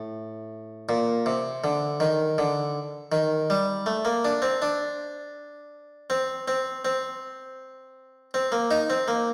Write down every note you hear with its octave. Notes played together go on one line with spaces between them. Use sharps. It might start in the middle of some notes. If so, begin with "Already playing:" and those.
Already playing: A2
A#2
C3
D3
D#3
D3
D#3
G3
A3
A#3
D4
C4
D4
C4
C4
C4
C4
A#3
D#4
C4
A#3